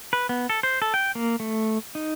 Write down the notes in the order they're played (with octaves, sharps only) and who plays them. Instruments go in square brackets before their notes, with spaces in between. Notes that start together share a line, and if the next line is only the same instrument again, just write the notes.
[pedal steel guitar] B4
B3
A4
C5
A4
G5
A#3
A3
D#4